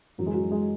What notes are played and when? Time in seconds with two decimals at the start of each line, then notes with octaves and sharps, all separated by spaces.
0.18 F#2 E3 F#3
0.26 G#3
0.34 F#3
0.52 G#3